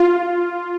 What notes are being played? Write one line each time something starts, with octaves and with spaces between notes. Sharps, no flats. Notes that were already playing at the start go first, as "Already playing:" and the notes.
Already playing: F4